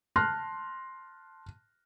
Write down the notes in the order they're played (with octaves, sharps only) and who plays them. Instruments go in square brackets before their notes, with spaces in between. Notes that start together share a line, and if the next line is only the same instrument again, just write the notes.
[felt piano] A5 C6 F6 F#6 A#6